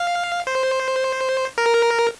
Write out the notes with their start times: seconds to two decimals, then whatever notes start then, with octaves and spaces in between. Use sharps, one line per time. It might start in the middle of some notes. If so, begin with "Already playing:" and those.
Already playing: F5
0.47 C5
1.58 A#4